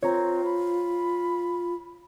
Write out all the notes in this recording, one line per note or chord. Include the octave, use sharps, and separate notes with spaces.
C4 F4 C#5 A#5
B5